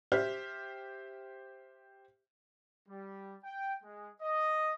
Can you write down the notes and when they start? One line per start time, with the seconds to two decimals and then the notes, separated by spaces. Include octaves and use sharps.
0.12 G4 C5 E5 F6
2.88 G3
3.44 G5
3.82 G#3
4.21 D#5